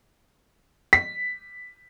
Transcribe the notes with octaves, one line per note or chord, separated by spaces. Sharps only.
B6